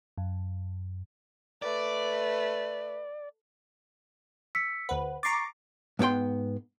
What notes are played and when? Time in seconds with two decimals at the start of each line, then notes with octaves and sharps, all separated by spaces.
0.18 F#2
1.62 A3 B4 D5
4.55 E6 B6 C#7
4.89 D2 B4 C5 F#5
5.23 A#5 C#6 D6 A6 C7
5.99 G#2 B3 D#4 G5 C6